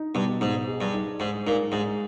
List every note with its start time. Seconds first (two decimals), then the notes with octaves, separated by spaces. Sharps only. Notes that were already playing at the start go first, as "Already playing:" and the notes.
Already playing: D#4
0.15 G2 B2
0.40 G#2 D#4
0.68 G#4
0.81 G2
0.94 D#4
1.20 G#2 G#3
1.46 A#2 D#4
1.72 G#2 G#3